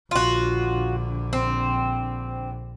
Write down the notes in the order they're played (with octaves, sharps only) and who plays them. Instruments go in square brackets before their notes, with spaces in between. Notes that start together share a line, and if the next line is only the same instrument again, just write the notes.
[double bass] A#1 D3 [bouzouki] F4 F#4
[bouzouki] C4